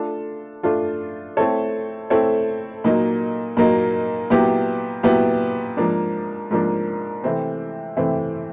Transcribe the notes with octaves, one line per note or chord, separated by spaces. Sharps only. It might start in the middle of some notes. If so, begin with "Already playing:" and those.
Already playing: A3 D4 F4 A4
A3 D4 F4 A4
A3 C4 E4 A4 C#5
A3 C4 E4 A4 C#5
A#2 F#3 A#3 D#4
A#2 F#3 A#3 D#4
A#2 F#3 B3 E4 G4
A#2 F#3 B3 E4 G4
G#2 F3 A#3 D4
G#2 F3 A#3 D4
C3 E3 A3 C4
C3 E3 A3 C4